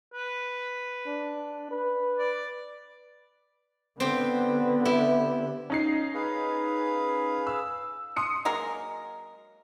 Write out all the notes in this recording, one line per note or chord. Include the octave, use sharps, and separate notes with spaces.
B4
D4
B4
D5
D3 B3 C4 G4
E4 G4
C#4 D#4 C7
G#4 B4 F5
E6
C6 D#6 C#7
F#3 G#3 A#3 A#4